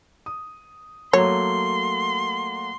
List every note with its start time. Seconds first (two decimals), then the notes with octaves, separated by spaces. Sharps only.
0.26 D#6
1.13 F#3 A3 A#3 C#5 C6